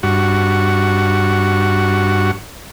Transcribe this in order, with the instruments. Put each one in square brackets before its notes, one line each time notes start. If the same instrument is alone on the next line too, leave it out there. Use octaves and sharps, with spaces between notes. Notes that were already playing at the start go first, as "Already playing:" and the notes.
[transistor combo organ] G2 F#4